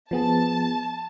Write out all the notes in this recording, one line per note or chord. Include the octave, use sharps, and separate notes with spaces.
F3 B3 G#4 A5